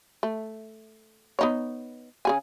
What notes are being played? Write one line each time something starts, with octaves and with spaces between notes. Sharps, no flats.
A3
B3 D#4 C#5
C#3 G#4 G#5